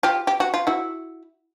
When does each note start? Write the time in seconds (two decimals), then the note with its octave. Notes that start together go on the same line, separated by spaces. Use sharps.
0.03 F4 G4
0.27 G4
0.40 F#4
0.54 F4
0.67 E4 F#4